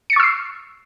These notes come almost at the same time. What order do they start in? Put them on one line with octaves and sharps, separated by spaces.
C#7 A6 C#6 E6 C7